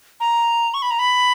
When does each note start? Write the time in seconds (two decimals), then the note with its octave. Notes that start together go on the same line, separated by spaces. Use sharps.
0.20 A#5
0.74 C#6
0.82 B5
0.91 A#5
0.99 B5